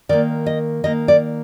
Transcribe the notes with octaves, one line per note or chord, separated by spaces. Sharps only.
D#3 A#3 D5
D#5
D#3 A#3 D#5
D5